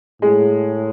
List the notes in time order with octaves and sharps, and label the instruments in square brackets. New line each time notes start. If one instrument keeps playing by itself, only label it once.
[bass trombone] A2 [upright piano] G#3